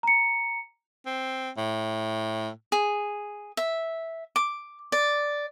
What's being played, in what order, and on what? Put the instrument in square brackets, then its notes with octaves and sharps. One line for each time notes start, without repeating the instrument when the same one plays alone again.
[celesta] A#5 C#7
[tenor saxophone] C4
A2
[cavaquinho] G#4
E5
D6
D5